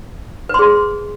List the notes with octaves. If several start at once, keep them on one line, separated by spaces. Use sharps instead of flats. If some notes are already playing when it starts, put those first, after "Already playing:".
G#4 B4 C6